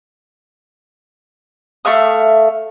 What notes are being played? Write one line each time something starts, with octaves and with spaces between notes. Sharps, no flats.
A3 E5 F5 D#6